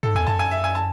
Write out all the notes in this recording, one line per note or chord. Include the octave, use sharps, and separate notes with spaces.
G#2 A4
E2 G#5
F#2 A5
G#5
E5
G#5
A5